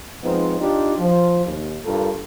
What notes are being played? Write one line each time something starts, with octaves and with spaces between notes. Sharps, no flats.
F3 G#3 B3 C4 D#4
D4 D#4 F4 G4
F3
D#2
G2 F4 A4 A#4